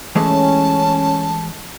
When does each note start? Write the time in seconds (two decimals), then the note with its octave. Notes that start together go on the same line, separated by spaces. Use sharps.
0.15 E3 G#3 A3 C#4 A5